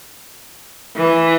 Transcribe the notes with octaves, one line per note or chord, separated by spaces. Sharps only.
E3